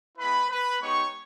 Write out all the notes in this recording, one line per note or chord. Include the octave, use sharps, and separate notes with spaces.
G#3 B3 E4 B4 B5
B4 B5
G#3 B3 D#4 G4 C#5 C#6